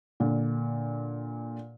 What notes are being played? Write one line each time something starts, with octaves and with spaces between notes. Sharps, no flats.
A#2 D3